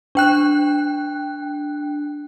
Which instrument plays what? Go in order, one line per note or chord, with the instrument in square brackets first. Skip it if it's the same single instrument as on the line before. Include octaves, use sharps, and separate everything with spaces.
[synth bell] D4 G5 F#6